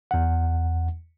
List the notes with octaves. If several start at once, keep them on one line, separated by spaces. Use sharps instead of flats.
E2 F#5